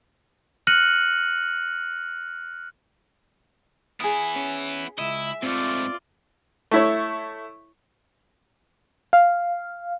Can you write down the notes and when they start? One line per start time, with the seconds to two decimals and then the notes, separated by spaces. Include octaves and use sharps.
0.67 F6 F#6 A#6 C#7 D#7 F#7
4.00 B3 E4 G#4 D#6
4.36 C#4
4.98 C#2 E4 D#5 E5
5.43 G#2 A3 C4 F4 D5
6.71 A3 E4 C#5
9.13 F5